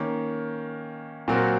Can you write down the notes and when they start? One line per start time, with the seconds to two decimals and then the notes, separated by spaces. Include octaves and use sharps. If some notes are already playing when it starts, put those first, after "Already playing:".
Already playing: D#3 A#3 C#4
1.28 A#2 F#3 C4 F#4 A#4